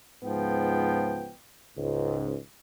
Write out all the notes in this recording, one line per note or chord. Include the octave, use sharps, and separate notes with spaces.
C#2 G#2 F3 B3 G5
C#2 G#2